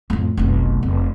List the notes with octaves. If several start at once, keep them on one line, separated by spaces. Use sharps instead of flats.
F2 A2
F1 B1
F1